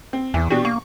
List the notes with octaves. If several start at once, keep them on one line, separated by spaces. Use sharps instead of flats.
C4
E2 E3
B2 D4 F#4 G4
A#3 C#6